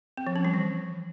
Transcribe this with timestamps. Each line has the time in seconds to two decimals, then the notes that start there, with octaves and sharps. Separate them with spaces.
0.17 C4
0.27 F3
0.36 C#4
0.45 G3
0.54 E3